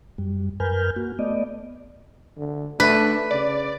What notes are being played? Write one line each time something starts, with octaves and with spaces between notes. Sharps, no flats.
F#2 G3
F#2 A#4 B4 G#5 F6 G6
A#3 F#4
A3 B3 D5 D#5
D3
A3 D4 B4
C#3 D5